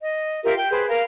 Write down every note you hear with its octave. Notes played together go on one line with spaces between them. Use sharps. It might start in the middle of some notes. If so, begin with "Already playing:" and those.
D#5
F4 G4 A#4 E5
G5 G6
G#4 B4 C5
A#4 F5